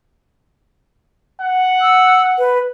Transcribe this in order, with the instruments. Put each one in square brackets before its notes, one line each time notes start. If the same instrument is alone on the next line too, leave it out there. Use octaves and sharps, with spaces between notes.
[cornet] F#5
[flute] E6
B4